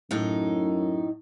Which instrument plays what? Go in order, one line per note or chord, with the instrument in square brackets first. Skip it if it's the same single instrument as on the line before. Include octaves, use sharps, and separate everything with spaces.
[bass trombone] F#2 [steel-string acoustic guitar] A2 D#4